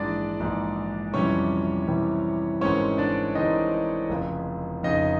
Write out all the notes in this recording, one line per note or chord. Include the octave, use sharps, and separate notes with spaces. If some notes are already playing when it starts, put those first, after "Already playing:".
Already playing: A#1 G#2 E3 G#3 D4 D5
A#1 G#2 E3 G#3
F2 C3 E3 G3 C#4 C#5
F2 C3 E3 G3
G#1 G#2 E3 G#3 C4 C#4 C#5
D4 D5
G#1 G#2 E3 G#3 C4 D#4 D#5
F1 F2 C#3
F1 F2 C#3 D#4 D#5